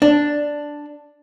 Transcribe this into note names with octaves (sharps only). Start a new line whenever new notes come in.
D4